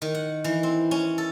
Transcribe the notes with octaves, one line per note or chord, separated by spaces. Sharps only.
D#3
F#5
E3
C4
C#4
A4